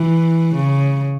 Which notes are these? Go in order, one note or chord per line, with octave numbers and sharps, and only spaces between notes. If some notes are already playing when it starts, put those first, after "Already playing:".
Already playing: E3
C#3